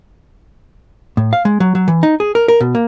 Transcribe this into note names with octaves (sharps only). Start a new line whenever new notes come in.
A2
F5
G#3
F#3
F#3
E3
D#4
G#4
A#4
A#4
B2
A#3